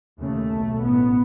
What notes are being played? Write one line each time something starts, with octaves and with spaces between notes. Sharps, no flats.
D#2 C#3 A3
B1 B2
A1 G#2 B3